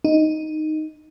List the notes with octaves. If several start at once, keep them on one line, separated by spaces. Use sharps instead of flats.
D#4